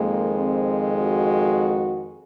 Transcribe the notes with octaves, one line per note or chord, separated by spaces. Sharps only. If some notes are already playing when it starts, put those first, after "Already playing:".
Already playing: F2 D#3 G#3 A#3
C4
F#4